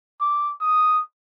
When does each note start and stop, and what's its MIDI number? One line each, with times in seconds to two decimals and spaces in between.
0.21 0.51 86
0.61 0.99 87